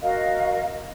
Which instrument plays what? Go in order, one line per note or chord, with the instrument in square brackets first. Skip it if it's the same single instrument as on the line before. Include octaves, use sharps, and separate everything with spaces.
[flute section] F#4 A#4 D#5 F5